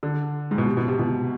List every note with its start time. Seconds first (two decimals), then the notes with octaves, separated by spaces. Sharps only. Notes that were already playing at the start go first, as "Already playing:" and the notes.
0.03 D3
0.51 G#2
0.58 B2
0.67 C3
0.77 B2
0.88 C3
0.99 B2